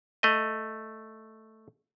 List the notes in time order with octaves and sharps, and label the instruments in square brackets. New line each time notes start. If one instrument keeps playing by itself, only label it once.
[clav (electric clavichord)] A3 D#5